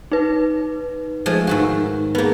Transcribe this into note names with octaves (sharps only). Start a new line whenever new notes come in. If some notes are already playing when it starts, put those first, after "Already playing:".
D#4 B4
F3 G#3 A3
G#2 D#3 F#4
A#3 B3 G#4 B4